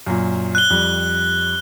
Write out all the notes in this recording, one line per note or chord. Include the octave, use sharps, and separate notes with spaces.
F#2 A#2
F#6 G7
F2 G3